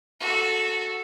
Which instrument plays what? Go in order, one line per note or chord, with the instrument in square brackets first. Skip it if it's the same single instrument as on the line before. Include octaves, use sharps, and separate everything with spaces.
[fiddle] F#4 A4